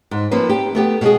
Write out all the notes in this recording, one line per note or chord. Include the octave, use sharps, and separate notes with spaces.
G#2
F3 A#3 C4 B4
G4
A3 B3 G4
B2 G#3 G#4